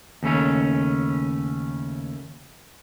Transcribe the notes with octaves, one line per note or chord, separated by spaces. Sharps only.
D#2 C#3 A3 C#4